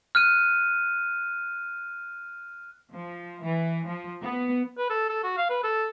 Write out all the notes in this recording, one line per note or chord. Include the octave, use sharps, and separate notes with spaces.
F6 F#6 D#7
F3
E3
F3
B3
B4
A4
A4
F#4
F5
B4
A4